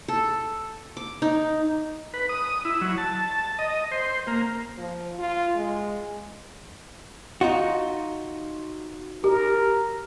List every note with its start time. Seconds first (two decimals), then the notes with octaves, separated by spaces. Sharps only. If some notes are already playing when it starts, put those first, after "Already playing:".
0.08 A4
0.97 D6
1.22 D#4
2.14 B4
2.29 D#6
2.65 E4
2.81 F#3
2.98 A5
3.59 D#5
3.92 C5
4.27 A#3
4.78 F3
5.19 F4
5.55 G#3
7.41 D#4 F4 F#4
9.24 G4 A#4